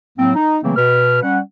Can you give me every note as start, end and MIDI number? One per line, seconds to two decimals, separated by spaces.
0.18 0.33 45
0.18 0.33 54
0.18 0.33 58
0.18 0.33 60
0.35 0.57 63
0.63 0.73 49
0.63 0.73 52
0.63 0.73 54
0.63 0.73 57
0.63 0.73 58
0.63 0.73 60
0.76 1.20 47
0.76 1.20 71
0.76 1.20 89
1.23 1.39 55
1.23 1.39 61
1.23 1.39 78